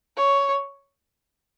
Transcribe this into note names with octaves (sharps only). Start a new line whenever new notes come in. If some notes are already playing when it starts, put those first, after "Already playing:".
C#5